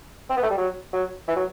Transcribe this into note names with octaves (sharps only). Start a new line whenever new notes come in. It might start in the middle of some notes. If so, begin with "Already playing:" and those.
C4
B3
A3
G3
F#3
F#3
E3
F#3